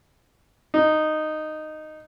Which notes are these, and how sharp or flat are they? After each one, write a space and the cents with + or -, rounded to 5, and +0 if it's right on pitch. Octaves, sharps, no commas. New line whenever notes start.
D#4 -10